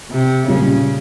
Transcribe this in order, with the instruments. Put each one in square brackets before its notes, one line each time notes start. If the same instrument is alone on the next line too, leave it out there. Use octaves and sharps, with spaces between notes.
[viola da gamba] C3
[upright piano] A#2 G3 C#4 [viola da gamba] C#3